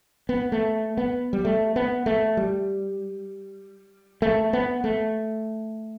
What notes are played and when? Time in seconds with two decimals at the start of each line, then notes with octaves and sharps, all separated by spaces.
0.29 B3
0.52 A3
0.97 B3
1.33 G3
1.45 A3
1.76 B3
2.06 A3
2.37 G3
4.22 A3
4.53 B3
4.84 A3